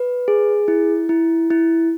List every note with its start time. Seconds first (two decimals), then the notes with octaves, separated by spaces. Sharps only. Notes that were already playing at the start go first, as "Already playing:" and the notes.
Already playing: B4
0.28 G#4
0.68 E4
1.09 E4
1.51 E4